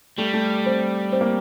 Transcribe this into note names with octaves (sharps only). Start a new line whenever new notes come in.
G3 A3
A3
C4
C4
A#3